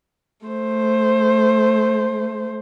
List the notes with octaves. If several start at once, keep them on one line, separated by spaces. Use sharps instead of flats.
A3 C5